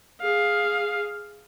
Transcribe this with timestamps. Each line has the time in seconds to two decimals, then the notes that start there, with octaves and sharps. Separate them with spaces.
0.21 G#4 F5